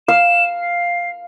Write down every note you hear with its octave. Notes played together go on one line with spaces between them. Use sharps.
F5 E7
C7